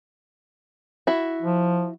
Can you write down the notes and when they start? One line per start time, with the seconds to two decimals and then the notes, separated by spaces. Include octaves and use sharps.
1.07 E4 F#4
1.42 F3